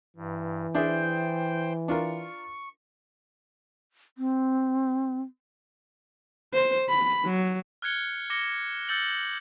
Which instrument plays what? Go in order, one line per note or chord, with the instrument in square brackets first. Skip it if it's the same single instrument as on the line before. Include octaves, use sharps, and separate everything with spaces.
[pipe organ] G2 [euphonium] E3
[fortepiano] D4 E4 G#4 [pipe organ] C5 G5 G6
[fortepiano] D4 F4 A#4 [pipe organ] C#6
[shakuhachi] C4
[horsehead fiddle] C5
B5
F#3
[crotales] F6 F#6 G#6 C#7 G7
D6 A#6 C#7 G7
E6 G6 A6 C#7 F#7